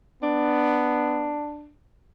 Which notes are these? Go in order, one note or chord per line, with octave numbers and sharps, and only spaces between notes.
B3 D4